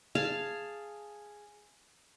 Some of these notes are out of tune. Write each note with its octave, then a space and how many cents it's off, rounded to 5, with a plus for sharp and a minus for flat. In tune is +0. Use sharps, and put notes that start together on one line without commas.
G#4 +0 F5 -10 A5 +0